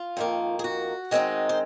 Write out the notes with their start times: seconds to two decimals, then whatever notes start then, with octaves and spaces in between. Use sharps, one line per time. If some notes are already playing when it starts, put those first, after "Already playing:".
Already playing: F4
0.17 F2 D#3 A#3
0.59 G#4
0.64 F#4
1.11 D#3 G#3 C4 D#4
1.49 C5